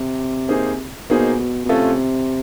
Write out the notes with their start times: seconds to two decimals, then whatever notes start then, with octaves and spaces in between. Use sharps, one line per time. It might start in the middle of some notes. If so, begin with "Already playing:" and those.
Already playing: C3
0.49 A#3 D#4 G#4 C5
1.10 B2 A#3 D#4 G#4 C5
1.39 B2
1.65 B2
1.69 C3 A3 C#4 F4 A4